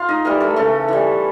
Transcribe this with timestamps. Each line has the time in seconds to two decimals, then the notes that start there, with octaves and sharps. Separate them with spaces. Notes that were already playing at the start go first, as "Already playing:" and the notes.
Already playing: F4 F5
0.09 D#4 D#5
0.25 E3 G3 A#3 A#4
0.40 A3 A4
0.56 C#3 A3 A4
0.88 E3 G3